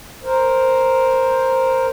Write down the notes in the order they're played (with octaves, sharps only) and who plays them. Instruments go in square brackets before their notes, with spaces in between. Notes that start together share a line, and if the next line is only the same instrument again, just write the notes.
[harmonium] A#4 C5